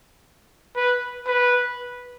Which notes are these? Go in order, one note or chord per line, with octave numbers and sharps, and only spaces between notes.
B4
B4